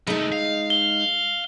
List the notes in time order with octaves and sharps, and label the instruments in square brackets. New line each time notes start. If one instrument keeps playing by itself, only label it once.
[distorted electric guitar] C2 A3 [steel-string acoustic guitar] G#3 D#4
[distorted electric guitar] F5
[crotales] G7